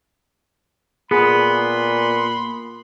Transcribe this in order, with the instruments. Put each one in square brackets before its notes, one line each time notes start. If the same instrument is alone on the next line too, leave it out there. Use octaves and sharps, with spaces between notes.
[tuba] A#2 [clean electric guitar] B3 [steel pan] G#4 [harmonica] B5 C6